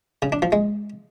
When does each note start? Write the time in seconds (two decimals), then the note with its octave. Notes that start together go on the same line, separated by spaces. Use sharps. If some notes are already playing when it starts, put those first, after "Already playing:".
0.22 C#3
0.32 D4
0.42 F3
0.52 G#3